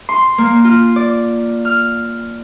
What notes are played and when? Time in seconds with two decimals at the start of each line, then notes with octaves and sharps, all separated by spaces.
0.09 C6
0.38 A#3
0.65 F4
0.96 D5
1.65 F6